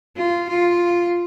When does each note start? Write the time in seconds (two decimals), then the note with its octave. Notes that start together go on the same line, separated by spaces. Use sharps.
0.17 F4
0.49 F4